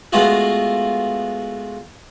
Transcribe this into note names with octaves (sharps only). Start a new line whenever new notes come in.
G#3 A3 B3 F4 F#4 G#4